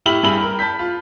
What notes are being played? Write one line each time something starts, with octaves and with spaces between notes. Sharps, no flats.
A2 E4 G4 B5 F6 F#7
G2 E4 G#4 G5 B5 F#7
A#4
A5 B5 G6 B6
F4